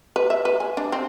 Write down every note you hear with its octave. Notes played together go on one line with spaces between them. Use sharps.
B4
E5
B4
G#5
D4
C4